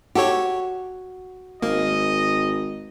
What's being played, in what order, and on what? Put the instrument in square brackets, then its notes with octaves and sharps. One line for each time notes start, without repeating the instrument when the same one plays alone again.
[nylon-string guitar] F#4 [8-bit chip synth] G4 A4 C#5
[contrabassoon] G#1 [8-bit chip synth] A#3 [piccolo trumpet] D#5